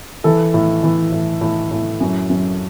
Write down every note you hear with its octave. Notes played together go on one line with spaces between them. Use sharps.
E3 A4
A2
E3
A2
A2
A2
F#2
F#2